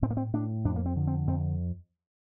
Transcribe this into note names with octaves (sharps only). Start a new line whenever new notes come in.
A2 C4
A#3
C4
A2 D4
F2 D4
A#3
C4
D3
C4
F2 C4